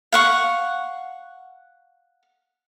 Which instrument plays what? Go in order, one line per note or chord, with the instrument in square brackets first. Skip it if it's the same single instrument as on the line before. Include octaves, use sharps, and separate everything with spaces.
[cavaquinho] F5 F#5 C#6